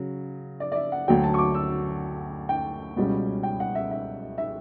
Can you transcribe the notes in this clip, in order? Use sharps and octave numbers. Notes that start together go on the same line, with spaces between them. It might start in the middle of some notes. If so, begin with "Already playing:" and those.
Already playing: C#3 F#3
D5
D5
E5
F#5
D2 D3 F#3 G5
A5
C#6
D6
E6
G5
C#2 B2 G3 C#4
G5
F#5
E5
E5
E5